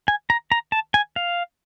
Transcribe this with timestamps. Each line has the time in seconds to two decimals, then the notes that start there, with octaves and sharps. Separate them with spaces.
0.08 G#5
0.30 A#5
0.52 A#5
0.72 A5
0.94 G#5
1.16 F5